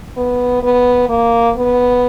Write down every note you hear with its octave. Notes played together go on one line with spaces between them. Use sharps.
B3
B3
A#3
B3